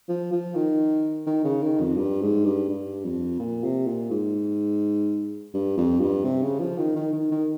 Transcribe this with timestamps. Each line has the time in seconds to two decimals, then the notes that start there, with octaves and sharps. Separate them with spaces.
0.09 F3
0.32 F3
0.55 D#3
1.27 D#3
1.44 C#3
1.63 D#3
1.80 F2
1.97 G2
2.21 G#2
2.45 G2
2.69 G2
3.05 F2
3.39 A#2
3.64 C3
3.87 A#2
4.11 G#2
5.54 G2
5.77 F2
6.00 G2
6.24 C3
6.43 C#3
6.60 F3
6.78 D#3
6.96 D#3
7.13 D#3
7.32 D#3